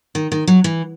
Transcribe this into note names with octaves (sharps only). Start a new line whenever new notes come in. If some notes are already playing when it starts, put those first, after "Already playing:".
D#3
D#3
F#3
E3